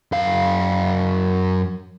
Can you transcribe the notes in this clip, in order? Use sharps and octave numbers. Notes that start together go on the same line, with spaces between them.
F#2 F5